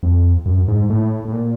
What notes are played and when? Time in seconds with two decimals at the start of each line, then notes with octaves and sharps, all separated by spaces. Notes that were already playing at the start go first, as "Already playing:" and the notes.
0.03 F2
0.46 F#2
0.68 G#2
0.90 A2
1.25 A2
1.33 A#2